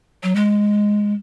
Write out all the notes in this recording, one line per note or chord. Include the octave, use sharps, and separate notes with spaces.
F#3
G#3